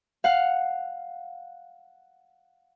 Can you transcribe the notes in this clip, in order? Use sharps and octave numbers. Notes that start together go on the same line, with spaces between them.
F5 F#5